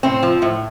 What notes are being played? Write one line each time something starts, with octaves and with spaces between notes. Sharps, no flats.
A2 C4
F3
A2